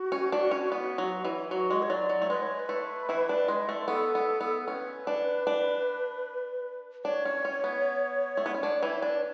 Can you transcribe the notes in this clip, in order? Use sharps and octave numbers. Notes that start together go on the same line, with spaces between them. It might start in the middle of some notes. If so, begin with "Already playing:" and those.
Already playing: F#4
C#4
D4
C#4
B3
F#3
E3
F#3 F#4
G#3
C#5
F#3 D5
F#3
A3
G#3 B4
C#5
C#5
B4
A3
E3 E4
D4
G#3
A3
B3 A4
B3
B3
C#4 B4
D4
D4
D4 C#5
C#4
C#4
B3
A3
B3
C#4
D4
E3 E4
D4